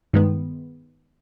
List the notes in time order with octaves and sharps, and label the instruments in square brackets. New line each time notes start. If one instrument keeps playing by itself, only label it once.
[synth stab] G2 D#3 G#3 B3